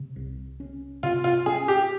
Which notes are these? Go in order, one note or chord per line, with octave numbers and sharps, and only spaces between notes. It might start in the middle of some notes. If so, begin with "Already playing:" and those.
Already playing: C3
C2
C#4
C3 F4
F4
C#4 G#4
G4